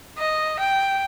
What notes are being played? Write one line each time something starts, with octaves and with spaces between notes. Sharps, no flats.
D#5
G5